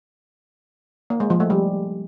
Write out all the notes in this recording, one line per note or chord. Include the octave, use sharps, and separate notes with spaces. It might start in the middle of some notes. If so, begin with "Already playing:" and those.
A#3
G#3
F3
A3
G3